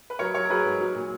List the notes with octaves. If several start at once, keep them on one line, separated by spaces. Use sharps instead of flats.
B4
F#3 A#4 C#5
F#3 A#4 C#5
A#4
F#3 G#4 B4
G#2
F#3
A#2